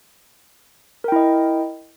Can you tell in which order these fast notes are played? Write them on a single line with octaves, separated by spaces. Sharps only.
A#4 G5 E4 D#5